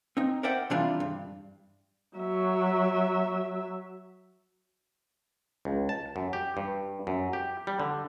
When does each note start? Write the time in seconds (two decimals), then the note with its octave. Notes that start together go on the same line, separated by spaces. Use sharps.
0.17 C4 D#4
0.43 A#4 C5 D5 E5 F#5 G5
0.70 C3 D#3 E3 G3 D4 F4
1.00 G2
2.17 F#3 E5
5.65 C#2
5.89 A5
6.16 F#2
6.33 G4
6.57 G2
7.07 F#2
7.33 G4
7.67 G3
7.80 D3